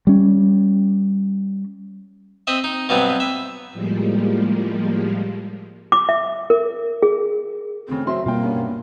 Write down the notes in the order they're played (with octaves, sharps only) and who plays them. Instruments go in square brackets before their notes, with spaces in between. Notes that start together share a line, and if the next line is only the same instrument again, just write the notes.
[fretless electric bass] G3 C#4
[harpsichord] C4 D#5 E5
D#4
G2 B2 F#3 B3 C4
E5
[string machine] A2 F3 G3 G#3 A#3
[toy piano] D6
E5
A#4
G#4
[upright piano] D2 C#3 [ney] C4
[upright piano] F#3 C4 C6 [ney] E5
[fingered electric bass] B2 G3 [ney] A#3 [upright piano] F4 G5
[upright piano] G2 B3 C#4